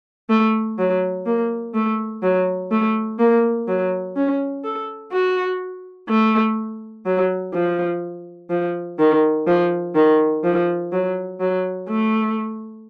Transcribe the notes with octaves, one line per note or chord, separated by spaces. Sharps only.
A3
F#3
A#3
A3
F#3
A3
A#3
F#3
C#4
A4
F#4
A3
F#3
F3
F3
D#3
F3
D#3
F3
F#3
F#3
A3